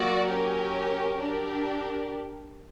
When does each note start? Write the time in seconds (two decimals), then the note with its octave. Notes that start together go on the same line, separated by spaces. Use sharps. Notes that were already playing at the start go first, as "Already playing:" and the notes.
Already playing: F#3 A#3 F#4 D5
0.27 C#4 G4 A#4
1.20 D4 G4 A#4